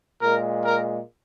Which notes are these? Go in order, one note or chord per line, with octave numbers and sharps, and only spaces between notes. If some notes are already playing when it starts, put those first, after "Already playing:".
A#2 G#3 A#4
A#4